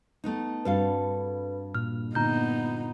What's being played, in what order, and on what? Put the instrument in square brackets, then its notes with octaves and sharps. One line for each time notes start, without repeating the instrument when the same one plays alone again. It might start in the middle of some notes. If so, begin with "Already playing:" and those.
[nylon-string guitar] A3 B3 D#4
[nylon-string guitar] G2 A4 F5 [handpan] C4 D4 F#4 [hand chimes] B4
[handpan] A#2 [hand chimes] F6
[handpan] A#2 D3 F4 [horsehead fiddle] B3 D#4 [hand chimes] A#5 G6